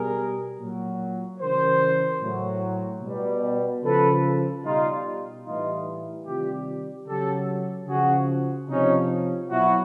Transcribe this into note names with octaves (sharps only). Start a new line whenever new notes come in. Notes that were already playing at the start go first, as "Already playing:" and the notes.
Already playing: B2 G3 G#4 A#4
A#2 F#3
C#3 E3 G3 A#4 C5
A2 F#3
B2 G3
C#3 F3 A4 B4
B2 G3 D#4 F4
A2 E3 G3 D#4 F4
C3 D#3 G3 F4 G4
C#3 F#3 G4 A4
C#3 F3 F#4 G#4
C3 F3 C#4 D#4
B2 F#3 E4 F#4